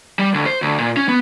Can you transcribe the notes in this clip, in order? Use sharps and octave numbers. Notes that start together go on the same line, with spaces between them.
G3
D2
C5
D2
A#2
C#4
B3